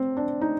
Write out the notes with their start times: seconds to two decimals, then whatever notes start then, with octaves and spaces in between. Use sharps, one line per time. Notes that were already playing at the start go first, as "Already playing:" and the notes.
Already playing: C4
0.17 D4
0.41 D#4